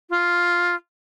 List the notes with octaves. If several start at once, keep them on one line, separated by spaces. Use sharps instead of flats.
F4